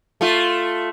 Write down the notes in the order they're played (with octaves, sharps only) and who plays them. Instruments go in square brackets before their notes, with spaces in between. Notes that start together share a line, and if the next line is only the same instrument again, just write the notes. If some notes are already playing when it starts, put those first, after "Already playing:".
[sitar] A3 F4